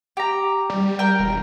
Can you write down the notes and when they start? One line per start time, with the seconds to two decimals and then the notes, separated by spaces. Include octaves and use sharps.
0.17 G4 A#5
0.70 G3
0.99 A#4 G5
1.20 E1